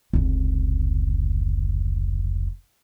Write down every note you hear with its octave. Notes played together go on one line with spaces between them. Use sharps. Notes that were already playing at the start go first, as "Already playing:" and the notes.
F1 C#2